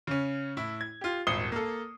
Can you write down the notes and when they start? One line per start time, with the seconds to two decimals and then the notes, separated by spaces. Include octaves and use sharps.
0.07 C#3 C#4
0.57 A2 E4
0.81 G#6
1.01 F4 G4
1.27 D#1 G#1 D#6 C7 G7
1.52 A#3 A4